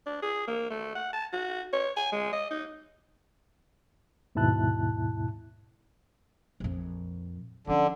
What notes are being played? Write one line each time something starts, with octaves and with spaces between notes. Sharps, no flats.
D4
G#4
A#3
A3
F#5
A5
F#4
C#5
G#5
G#3
D#5
D#4
D#2 G#2 B2 E4 A5 F#6
A#1 F2
D3 F3 C#4